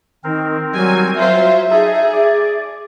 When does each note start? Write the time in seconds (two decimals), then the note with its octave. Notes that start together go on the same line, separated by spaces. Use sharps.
0.24 D#3 C4 A#4
0.73 F#3 G3 G#5
1.16 F#3 F4 C5 E5
1.71 D#4 G#4 A4
2.12 D5